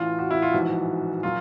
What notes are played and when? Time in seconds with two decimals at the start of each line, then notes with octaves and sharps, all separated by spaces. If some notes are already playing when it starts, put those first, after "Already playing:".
Already playing: A1 A2 E3 F4
0.19 F#4
0.31 E4
0.42 F4
0.53 A#1 G#2 E3 F#4
1.23 A#2 F#3 F4